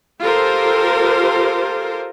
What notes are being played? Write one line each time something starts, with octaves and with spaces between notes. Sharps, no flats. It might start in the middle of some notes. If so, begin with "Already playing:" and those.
F4 G4 A4 A#4 C5